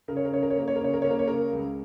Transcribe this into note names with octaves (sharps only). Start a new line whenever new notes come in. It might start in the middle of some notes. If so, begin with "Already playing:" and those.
C#3 A#4
C#5
A#4
C#3 C#5
A#4
C#5
A#3 A#4
C#5
A#4
C#3 C#5
A#4
A#3 C#5
A#4
C#5
C#3 A#4
C#2